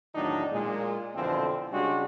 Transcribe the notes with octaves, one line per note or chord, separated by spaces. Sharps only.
E2 A2 D#3 F#3 D4 D#4
A#2 G#3
F2 B2 D3 E3 F3 C4
C#3 G3 G#3 D4 F#4 G4